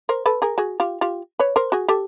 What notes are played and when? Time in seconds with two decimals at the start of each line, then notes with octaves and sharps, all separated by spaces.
0.09 A#4 C5
0.26 A4 B4
0.42 G#4 A#4
0.58 F#4 G#4
0.80 F4 G4
1.01 F4 G4
1.39 B4 C#5
1.56 A#4 C5
1.72 F#4 G#4
1.88 G4 A4